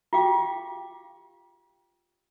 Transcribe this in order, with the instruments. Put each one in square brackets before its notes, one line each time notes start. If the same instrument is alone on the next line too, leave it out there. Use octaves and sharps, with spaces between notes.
[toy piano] F4 G4 F5 G5 D6